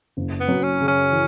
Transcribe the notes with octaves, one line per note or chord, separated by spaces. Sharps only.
F#1
B3
F#2
C#4
C#3
C#4
E3